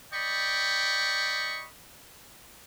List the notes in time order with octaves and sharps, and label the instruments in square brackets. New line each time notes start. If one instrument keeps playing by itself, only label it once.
[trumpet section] D5 D#5 G5 B5 C#6